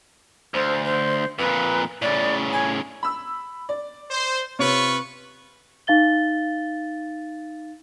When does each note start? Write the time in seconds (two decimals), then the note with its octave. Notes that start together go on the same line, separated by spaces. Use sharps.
0.54 D2 C5
0.85 C5
1.39 F2 A#2 B4
2.02 A2 C#3 D5
2.53 G#5
3.03 B5 E6
3.69 D5
4.11 C5
4.59 C3 F4 B4 C#5 C#6
5.87 D#4 F5 A6 G7